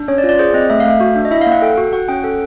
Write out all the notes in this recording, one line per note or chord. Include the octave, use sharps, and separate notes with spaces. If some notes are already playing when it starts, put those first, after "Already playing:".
Already playing: D4
C#4 C#5
D5
F4
D5
G#4 C5
C4 D#5
A3 E5
F5
A3 E5
F#4
D4
D#5
E4 E5
F5
A#3
F#5
A4 G5
F#4
F#4 F#5
C#4 G5
A4 F#5